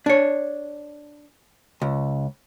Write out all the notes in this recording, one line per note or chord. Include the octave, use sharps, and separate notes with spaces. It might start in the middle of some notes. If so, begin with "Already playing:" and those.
D4 C#5
C#2